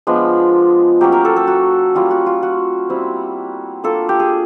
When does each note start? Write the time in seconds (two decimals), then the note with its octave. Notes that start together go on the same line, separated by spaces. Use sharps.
0.07 F3 G#3 B3 D4
1.01 F#3 A#3 C#4 G4
1.12 A#4
1.25 A4
1.36 A4
1.47 F#4
1.95 G3 A#3 C#4 F4
2.11 F#4
2.26 F4
2.43 F#4
2.90 G3 C4 E4
3.84 A#3 D4 F4 A4
4.09 G4
4.20 G#4